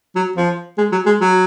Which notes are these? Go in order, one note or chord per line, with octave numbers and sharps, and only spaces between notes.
F#3
F3
G#3
F#3
G#3
F#3